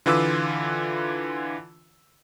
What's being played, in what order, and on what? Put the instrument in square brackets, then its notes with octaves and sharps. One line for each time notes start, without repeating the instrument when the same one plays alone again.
[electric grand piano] D3 E3 F4 B4 D6 E6